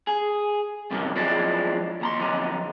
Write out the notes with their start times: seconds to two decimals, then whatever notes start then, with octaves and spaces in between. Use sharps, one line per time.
0.07 G#4
0.91 G2 C3 D#3 F#3
1.16 F3 F#3 G#3 C4 D4 E4
2.01 D#2 A#5 C6
2.20 F2 D3 F#3 D#4